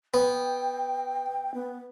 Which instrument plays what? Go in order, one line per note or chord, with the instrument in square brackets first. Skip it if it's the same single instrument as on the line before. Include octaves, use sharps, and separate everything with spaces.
[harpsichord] B3 [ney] G5
[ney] B3